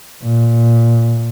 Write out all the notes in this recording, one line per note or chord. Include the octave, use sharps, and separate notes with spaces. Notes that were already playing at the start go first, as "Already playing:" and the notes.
A#2